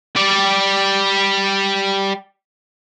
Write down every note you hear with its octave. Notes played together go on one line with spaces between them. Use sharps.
G3 D5